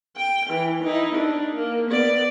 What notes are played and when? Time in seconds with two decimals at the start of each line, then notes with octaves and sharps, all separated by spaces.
0.17 G5
0.50 E3
0.84 D#4 E4
1.15 D4
1.55 A#3
1.90 B3 D5